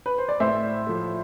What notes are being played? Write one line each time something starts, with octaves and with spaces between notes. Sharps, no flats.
B4
C5
D5
A2 C5 E5
F3 A3